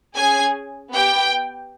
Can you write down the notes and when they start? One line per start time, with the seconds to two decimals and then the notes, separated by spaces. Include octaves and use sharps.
0.15 C#4 G#4 G#5
0.91 B3 G4 G5